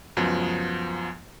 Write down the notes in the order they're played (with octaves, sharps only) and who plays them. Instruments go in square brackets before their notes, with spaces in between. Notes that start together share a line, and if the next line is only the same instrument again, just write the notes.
[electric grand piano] C#2 F#2 F3 B3